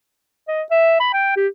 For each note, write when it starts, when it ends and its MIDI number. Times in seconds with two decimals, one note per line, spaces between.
0.48 0.63 75
0.71 0.97 76
1.00 1.10 83
1.13 1.35 79
1.37 1.47 67